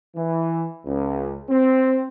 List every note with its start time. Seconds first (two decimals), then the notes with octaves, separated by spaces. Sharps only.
0.16 E3
0.86 C#2
1.50 C4